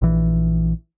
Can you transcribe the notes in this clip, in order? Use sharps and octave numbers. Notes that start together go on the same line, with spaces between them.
A#1 E3